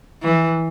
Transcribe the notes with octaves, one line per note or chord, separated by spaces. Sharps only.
E3